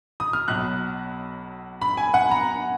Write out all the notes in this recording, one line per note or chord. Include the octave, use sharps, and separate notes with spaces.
D#6
F6
B1 B2 F#3 F#6
B5
G#5
F#5
A#5